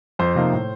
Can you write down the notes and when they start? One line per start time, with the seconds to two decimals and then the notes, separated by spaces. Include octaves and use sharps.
0.19 F2 C5
0.35 C3 F3 A#3 D#4
0.53 A2